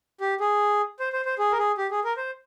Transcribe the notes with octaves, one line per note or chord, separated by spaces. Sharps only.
G4
G#4
C5
C5
C5
G#4
A#4
G#4
G4
G#4
A#4
C5